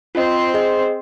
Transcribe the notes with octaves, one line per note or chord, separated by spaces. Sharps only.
C4 F4 C5 D#5
G#4 D#5